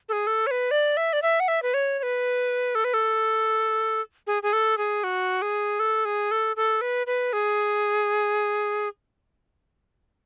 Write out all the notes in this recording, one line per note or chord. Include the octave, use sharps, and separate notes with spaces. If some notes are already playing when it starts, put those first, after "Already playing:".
A4
G#4
A4
C#5
B4
D5
E5
D5
E5
F#5
E5
B4
C#5
C#5
B4
A4
B4
A4
G#4
G#4
A4
G#4
F#4
G#4
A4
G#4
A4
A4
B4
B4
G#4